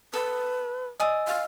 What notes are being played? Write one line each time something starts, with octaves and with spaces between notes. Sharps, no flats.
A4 B4
D5 D#5 G#5 D#6 E6
F5